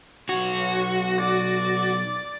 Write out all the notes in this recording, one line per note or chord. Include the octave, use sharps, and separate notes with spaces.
B1 F#4 C#5
D5